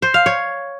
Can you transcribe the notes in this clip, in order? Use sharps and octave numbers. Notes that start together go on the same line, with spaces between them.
C5
F5
C#5